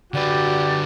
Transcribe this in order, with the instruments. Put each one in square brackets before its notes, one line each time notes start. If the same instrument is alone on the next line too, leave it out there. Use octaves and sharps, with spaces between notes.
[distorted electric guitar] D3 B4 [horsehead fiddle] F#4 [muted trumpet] G4 [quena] D5